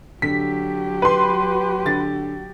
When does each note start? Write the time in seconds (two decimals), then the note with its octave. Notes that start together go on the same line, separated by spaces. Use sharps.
0.22 D3 F#3 G4 B6
1.02 B4 C6
1.86 D3 A6